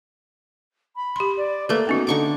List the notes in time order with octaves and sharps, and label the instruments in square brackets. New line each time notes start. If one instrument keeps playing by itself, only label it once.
[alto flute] B5
[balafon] G4 C6
[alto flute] D5
[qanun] A3 A#3 [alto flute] B4
[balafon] B3 C#4 F#4 [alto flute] D#4
[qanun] D3 C#6 D6 [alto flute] D#4